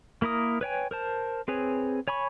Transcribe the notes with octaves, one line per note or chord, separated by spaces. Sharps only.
A#3 E4 A#4 D#6
B4 C#5 G5 G#5
A#4 C5 A5
C4 G#4 B4 C#5 G#5
C#5 G#5 B5 C#6